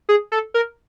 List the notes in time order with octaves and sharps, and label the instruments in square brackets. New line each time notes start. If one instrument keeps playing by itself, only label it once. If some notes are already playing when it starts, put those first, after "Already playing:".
[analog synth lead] G#4
A4
A#4